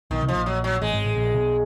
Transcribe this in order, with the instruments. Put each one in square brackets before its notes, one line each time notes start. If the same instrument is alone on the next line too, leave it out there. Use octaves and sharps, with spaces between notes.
[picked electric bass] B1 B2 [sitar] D#3
[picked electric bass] C2 C3
[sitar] F3
[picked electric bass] A#1 A#2
[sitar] F#3
F#3
[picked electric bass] A1 A2 [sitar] G#3
[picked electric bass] G#1 G#2
A1 A2
A#1 A#2
B1 B2